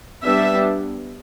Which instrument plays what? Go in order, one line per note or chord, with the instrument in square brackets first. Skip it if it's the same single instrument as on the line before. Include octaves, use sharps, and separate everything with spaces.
[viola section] G3 B3 D4 E5